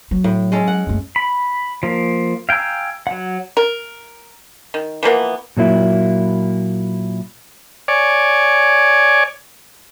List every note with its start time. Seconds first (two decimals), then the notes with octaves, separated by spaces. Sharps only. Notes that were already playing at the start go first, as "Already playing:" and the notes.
0.11 F#3
0.24 A2
0.52 G#3 C#4 A4
0.67 F#5
0.87 F#2 A3
1.16 B5
1.83 F3 A#3
2.49 F5 G5 G#5 A#5 E6
3.07 F#3 F#5
3.57 A#4
4.74 D#3
5.03 E3 F3 A#3 B3
5.57 A#2 F#3 A#3 E4
7.88 C#5 D5 G#5